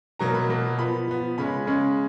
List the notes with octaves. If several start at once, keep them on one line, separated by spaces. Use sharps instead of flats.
B2 F#3 A#3 A#5
B5
B2 F#3 A#3
F3 B3 B5
F3 B3
C#3 G#3 C#4 B5
C#3 G#3 C#4